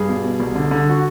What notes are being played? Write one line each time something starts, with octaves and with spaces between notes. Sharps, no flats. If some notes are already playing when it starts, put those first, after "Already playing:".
Already playing: G2 G#4
B2
B2
C2
D3
D3
F#4